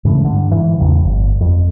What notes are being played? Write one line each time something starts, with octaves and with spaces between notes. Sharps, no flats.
G#2 C#3 E3 A3
G2 D3
G#2 E3
A1 E2 C#3 F3
G1
F2